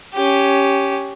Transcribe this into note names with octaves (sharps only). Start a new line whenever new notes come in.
C#4 G4